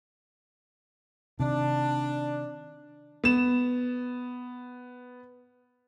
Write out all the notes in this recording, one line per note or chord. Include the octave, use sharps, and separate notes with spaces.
C3 D#3 D4
B3 E7